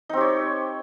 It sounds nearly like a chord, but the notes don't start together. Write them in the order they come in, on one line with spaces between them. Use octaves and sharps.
D#4 C4 G4 C#5